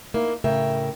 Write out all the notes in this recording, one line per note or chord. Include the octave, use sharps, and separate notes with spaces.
A#3 D#4 E4
A2 C#3 A#4 E5 G5